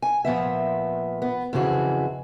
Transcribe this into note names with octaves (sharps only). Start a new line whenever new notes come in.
G#5
A#2 F3 B3 E5
B3
F2 C#3 E3 F#4 G#4